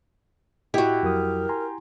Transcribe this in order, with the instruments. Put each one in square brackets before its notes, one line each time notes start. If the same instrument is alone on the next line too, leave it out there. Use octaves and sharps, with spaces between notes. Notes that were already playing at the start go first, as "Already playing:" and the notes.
[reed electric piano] A2 D#5 [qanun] E4 F#4 [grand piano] G4
[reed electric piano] F2 F#3 D#6 [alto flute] A#4
[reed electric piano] G#5 A#5 C6